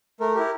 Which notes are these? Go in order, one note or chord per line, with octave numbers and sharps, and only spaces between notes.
A3 A#4
E4 G4 A#4